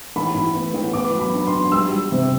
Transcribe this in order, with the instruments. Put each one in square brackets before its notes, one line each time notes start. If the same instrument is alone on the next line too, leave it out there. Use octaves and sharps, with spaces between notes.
[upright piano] A1 B5
A2
B3
A1
B3 D6
F#3
B5
D4
C6
D4
G3 E6
G3
C3